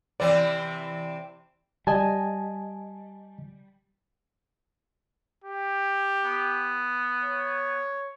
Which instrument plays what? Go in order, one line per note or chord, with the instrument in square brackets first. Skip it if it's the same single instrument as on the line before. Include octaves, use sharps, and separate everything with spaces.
[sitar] C3 E3 C4 [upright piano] D5
[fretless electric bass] G3 [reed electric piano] D#5 G#5 A5
[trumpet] G4
[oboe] B3
[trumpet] C#5